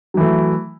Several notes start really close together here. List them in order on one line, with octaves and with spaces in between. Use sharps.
F#3 E3 A3